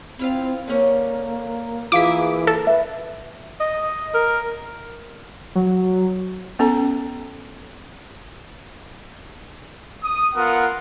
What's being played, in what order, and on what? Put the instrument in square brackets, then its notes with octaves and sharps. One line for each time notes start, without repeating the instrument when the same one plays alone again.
[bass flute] C4 [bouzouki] E4 F4 F5
[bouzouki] D3 C#4 [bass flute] A#3
[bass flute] E3 [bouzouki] A#3 G#4 E5 [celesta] F4 F5 [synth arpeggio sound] D6 B6
[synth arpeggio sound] A4
[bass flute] B4 [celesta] E5
[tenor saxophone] D#5
A#4
[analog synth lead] F#3
[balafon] B3 C#4 A4 A#5
[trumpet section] D#6
B3 F4 A#4 F#5